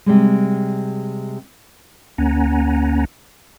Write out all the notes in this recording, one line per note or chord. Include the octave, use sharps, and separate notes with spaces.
C3 G3 G#3
D2 A#3 C#4 F#5 G#5 A#5